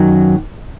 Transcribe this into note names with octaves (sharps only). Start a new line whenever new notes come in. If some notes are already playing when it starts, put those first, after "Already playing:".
Already playing: F#2 D#3 F#3